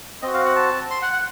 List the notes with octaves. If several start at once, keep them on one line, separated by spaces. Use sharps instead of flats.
C4 F#4 D#5
F5
F#5
A5
C6
F#5
F#5